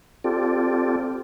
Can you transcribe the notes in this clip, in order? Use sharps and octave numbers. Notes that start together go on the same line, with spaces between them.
C4 F4 G4 A4 D5